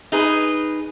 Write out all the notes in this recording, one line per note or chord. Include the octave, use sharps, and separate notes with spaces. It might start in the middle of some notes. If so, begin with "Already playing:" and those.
D#4 G#4 B4